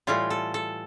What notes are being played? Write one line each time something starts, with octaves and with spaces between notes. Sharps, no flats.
A2 E3 G3 F4
A4
A4